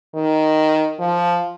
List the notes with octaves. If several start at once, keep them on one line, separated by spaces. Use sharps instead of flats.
D#3
F3